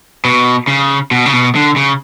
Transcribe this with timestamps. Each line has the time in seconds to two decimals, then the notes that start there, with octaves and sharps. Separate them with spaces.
0.25 B2
0.68 C#3
1.11 B2
1.26 C#3
1.33 B2
1.55 D3
1.76 C#3